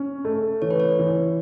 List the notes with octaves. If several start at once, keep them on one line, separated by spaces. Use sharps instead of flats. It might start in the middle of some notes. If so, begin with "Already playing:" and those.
Already playing: C#4
A3
E3 C#5
B4
C#5
E3